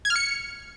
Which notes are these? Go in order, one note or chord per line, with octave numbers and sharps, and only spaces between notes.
G#6
F6
C#7